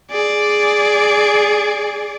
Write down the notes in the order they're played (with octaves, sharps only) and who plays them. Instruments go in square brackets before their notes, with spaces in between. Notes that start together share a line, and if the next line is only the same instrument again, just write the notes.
[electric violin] G#4 D5